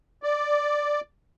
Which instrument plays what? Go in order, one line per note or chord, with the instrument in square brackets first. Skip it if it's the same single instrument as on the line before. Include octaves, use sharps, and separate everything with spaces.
[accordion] D5